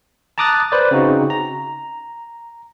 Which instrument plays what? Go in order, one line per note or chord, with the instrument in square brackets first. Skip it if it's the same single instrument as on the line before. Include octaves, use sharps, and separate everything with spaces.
[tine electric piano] A5 A#5 D6 D#6 F#6 A6
B4 C5 D5
C#3 C4 D#4 F#4
A#5